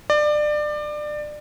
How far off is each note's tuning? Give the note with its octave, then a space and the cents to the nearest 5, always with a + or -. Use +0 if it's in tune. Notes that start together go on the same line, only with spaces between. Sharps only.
D5 +25